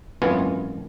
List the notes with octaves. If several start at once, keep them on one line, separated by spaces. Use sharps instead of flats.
G#1 F#2 E3 B3 F4 G#5